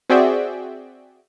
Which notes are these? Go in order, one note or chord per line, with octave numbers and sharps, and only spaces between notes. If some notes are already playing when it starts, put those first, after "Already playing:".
C4 F#4 G#4 D5 E5 G5